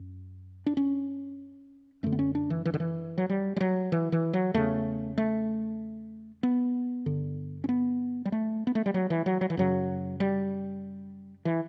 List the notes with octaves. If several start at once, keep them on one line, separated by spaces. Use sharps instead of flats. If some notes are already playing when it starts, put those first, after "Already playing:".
Already playing: F#2
D4
C#4
F#2 D3 A3
B3
C#4
D4
E3
E3
D3
E3
F#3
G3
G3
F#3
E3
E3
F#3
E2 C#3 A3
A3
B3
G2 D3
C#4
B3
G3
A3
B3
A3
G3
F#3
E3
F#3
F#3
E3
F#2 C#3 F#3
G3
E3